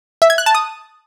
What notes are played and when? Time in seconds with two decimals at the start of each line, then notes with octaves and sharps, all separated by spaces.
0.22 E5
0.30 G#6
0.38 F#6
0.46 A5
0.55 D#6